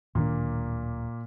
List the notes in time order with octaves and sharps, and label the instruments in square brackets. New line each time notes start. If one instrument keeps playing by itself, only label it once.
[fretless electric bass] D1 D#3 D4 [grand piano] A#2 A#3